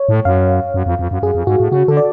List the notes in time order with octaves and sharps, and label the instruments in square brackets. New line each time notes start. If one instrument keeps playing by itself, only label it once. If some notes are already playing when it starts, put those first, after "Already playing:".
Already playing: [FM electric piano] C#5
[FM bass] A2
[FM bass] F#2 [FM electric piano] F5
[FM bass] F#2
F2
F2
F#2
[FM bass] F#2 [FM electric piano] G#4
[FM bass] F2
[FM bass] G#2 [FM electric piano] F#4
[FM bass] A2
[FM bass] C#3 [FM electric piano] F#4
[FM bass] D3 [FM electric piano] A4
[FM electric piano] D5